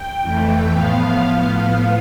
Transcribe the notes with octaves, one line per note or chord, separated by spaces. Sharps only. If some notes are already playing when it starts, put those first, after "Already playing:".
Already playing: G5
F2 E3 A3
A2 F3 B3 F5